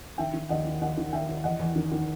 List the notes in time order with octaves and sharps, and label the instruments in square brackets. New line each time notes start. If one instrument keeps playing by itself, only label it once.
[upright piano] D#3 E5 G5
D#3
D#2 D#5 F#5
D#3
D#2 D#5 F#5
D#3
D#2 E5 G5
D#2
E2 D#5 F#5
E2
D#3
D#3